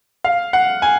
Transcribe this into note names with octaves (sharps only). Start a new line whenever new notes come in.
F5
F#5
G#5